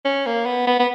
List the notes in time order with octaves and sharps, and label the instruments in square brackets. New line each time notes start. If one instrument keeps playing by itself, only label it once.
[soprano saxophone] C#4
A#3
B3
B3
B3